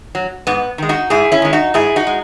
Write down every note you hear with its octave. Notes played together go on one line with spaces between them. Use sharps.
F#3
G#2 B3
D#3 G#3
D#4 F#4
G#2 E4 G#4
C#4 E4
D#3 G#3
D#4 F#4
G#2 E4 G#4
D#4 F#4
G#3